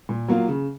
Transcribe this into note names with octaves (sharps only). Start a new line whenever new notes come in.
A#2
F#3 A#3 F4
C#3